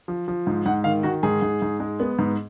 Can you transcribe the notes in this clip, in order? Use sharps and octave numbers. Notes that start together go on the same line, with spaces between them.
F3
F3
G#2
G#2 F#5
D#3 F5
D#3 F#4
G#2 G#4
G#2
G#2
G#3
B3
G#2